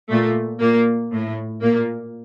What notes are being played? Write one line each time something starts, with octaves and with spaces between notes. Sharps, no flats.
A#2 A3
A#2 A#3
A2
A#2 A#3